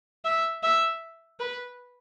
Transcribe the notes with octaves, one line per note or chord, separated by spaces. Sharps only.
E5
E5
B4